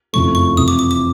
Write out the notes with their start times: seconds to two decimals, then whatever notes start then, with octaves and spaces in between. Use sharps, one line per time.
0.13 F#1 F2 C#3 F3 A3 C#6
0.35 C#6
0.57 F2 C3 E3 D#6
0.68 D6
0.79 D6
0.91 D6